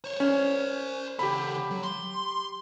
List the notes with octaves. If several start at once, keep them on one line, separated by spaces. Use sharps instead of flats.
C5 C#5
C#4 C5 D5
C#3 G4 A4 B5
F#3
C6